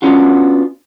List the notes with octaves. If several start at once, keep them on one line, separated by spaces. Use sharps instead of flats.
B3 C#4 D4 F4 F#4